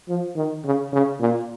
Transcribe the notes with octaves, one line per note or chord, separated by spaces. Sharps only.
F3
D#3
C#3
C#3
A#2